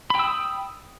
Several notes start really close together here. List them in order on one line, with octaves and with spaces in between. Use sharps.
B5 G5 E6 D#6